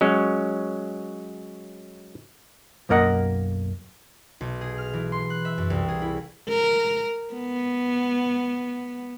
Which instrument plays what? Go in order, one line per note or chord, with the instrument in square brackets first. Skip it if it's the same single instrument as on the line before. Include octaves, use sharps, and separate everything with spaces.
[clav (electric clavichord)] F#3 G#3 C#4
[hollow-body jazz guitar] B1 F#2 A#3 A#4 D#5 F#5
[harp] B1
G#4
F6
E3
C6
F#6
E5
F#2
C2
G#4
E4
[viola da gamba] A#4
B3